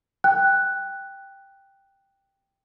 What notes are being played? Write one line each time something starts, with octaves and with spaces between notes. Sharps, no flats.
G5 F#6